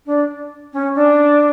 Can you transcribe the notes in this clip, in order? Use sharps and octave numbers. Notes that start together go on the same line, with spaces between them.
D4
C#4
D4